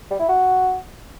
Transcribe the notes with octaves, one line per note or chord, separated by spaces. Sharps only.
G3
E4
F#4